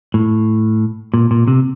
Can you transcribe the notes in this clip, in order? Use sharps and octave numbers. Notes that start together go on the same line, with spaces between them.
A2
A#2
A#2
C3